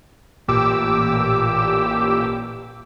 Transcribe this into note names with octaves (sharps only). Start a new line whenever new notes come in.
A1 A#2 G4 D6 E6